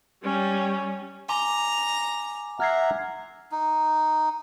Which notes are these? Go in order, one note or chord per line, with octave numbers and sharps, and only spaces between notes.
G3 C#4
G#5 A#5 C6 D6
E5 F#5 A#5 F6 G#6 C7
D#4